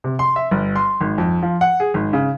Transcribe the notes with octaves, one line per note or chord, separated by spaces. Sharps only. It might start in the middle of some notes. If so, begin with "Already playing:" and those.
C3
C6
E5
G1
C6
G#1
F2
F3
F#5
G#4
G#1
C#3